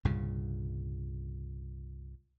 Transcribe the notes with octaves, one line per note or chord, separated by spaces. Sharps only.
C2 G2 A#2 C#3